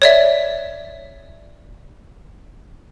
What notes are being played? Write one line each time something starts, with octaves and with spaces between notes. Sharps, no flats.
C#5 D5 E5